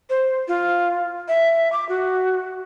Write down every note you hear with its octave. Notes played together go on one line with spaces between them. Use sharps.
C5
F4
E5
D6
F#4